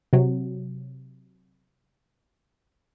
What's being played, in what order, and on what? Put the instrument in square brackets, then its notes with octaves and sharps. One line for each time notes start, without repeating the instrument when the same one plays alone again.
[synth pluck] C3 F#3